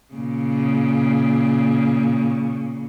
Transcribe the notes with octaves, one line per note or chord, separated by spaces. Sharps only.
A#2 C#3